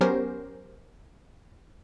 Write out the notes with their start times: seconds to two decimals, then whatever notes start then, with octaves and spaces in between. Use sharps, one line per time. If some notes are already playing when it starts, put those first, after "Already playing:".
0.01 F#3 B3 C#4 G4 A#4 C5